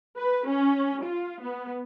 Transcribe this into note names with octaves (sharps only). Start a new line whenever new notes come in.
B4
C#4
F4
B3